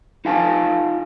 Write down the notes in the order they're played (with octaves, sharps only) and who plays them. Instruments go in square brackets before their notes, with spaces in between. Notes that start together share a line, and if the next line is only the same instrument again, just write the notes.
[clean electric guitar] D#4 F4 F5 G#5 A5